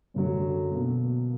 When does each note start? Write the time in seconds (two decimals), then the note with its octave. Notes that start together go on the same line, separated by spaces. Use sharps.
0.14 F#2 D3 F#3
0.71 B2 A#3